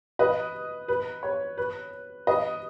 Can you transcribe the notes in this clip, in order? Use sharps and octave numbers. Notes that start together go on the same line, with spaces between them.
B4 D#5
B4
C#5
B4
B4 D#5